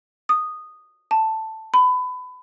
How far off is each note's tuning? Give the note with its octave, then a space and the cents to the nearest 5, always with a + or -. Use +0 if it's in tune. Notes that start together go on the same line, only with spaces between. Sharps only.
D#6 -10
A5 +5
B5 +25